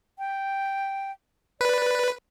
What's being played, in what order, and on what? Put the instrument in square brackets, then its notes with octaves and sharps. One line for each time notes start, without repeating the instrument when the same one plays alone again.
[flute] G5
[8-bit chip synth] B4 [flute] D5